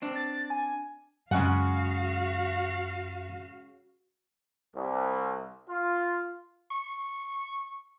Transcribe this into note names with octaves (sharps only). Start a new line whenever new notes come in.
C4 D4
A6
G#5
F#2 C#3 G#3 F#4 F5 F#5
C2
F4
C#6